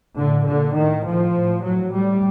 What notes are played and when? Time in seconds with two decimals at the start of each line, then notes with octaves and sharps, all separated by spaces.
0.18 A2 D3
0.48 A#2 D3
0.77 A2 D#3
1.06 A2 F3
1.36 A2
1.64 A2 F#3
1.94 A2 G3